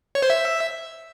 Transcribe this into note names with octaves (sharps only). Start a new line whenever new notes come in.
C#5
C5
E5